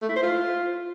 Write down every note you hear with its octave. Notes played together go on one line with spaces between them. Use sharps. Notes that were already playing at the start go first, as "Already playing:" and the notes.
A3
E4
C5
F4